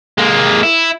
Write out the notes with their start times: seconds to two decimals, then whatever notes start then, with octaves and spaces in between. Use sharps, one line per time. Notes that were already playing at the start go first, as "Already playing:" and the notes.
0.18 G#3 A#3
0.63 E4